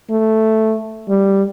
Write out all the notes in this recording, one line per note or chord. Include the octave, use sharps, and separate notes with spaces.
A3
G3